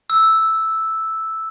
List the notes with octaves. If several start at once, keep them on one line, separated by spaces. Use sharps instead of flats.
E6